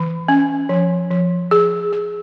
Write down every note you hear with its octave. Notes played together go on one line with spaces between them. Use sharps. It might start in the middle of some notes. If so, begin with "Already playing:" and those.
Already playing: E3
C#4
F3
F3
G#4
G#4